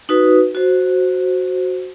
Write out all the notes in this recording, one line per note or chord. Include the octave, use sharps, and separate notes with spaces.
D#4 F#4 B4
F#4 C5